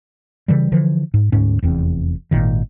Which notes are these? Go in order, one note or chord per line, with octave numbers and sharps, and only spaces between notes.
C#3 E3 G3
D3 E3 F3
G#2
D2 G#2 C#4
F1 E2 C4
G#1 A#2 D#3